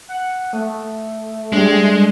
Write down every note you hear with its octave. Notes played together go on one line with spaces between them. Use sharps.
F#5
A3 D#6
G3 G#3 D4